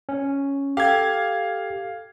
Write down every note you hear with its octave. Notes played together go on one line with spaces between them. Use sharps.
C#4
G4 A4 F5 G#6